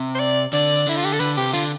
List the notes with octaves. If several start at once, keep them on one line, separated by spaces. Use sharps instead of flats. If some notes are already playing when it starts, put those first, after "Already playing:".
Already playing: C3
C5
D5
D3 D5
D3 E4
F4
G4
A4
D3 B4
C3 G4
D3 F4